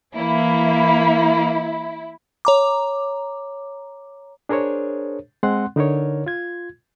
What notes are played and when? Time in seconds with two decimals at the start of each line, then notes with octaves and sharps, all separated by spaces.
0.15 E3 A#3 E4
2.45 C#5 A#5 D6
4.49 D4 G#4 A#4 C5 C#5
5.43 G#3 C4 F#5 C6 F#6
5.76 D3 D#4 A#4 C#5
6.26 F4 G#6